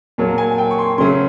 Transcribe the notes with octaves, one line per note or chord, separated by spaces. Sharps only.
A#2 F#3 A#3 A5
G#5
G5
C#6
C6
C#3 F#3 A3 C#4 C6